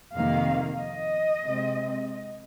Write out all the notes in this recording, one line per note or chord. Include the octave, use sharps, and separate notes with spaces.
F2 C3 D#3 A#3 F5
D#5
C3 G#3 C4